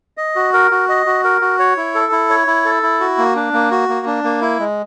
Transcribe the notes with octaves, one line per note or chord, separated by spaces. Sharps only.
D#5
F#4
A#4
F#4
D#5
F#4
A#4
F#4
C#5
E4
A4
E4
C#5
E4
A4
E4
F#4
A#3
D4
A#3
F#4
A#3
D4
A#3
E4
G#3